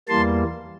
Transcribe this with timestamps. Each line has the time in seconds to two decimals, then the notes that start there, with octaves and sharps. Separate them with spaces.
0.08 E2 E3 G3 A#3 A5 C6